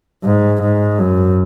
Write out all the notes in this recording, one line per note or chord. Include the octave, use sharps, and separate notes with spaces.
G#2
G#2
F#2